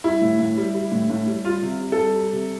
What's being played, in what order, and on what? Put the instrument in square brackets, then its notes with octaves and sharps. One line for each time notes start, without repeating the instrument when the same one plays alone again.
[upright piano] G3 E4
A2
A2
G3
G3
A2
A2
G3
G3 F4
C3
C3
A4
G3
G3
C3